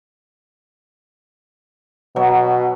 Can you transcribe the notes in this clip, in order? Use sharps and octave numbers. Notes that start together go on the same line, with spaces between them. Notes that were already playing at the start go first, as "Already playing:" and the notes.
B2 F#3